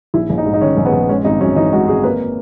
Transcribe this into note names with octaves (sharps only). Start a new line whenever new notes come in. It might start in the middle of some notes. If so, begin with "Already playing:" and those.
A#1 E4
A#1
D#4
G#2
D#4
D#3 C#4
A#1
B3
A#1
G#3 C#4
G#1 D#4
F#2 C#4
E3 D#4
G#3 F#4
G#1 G#4
A#3 B4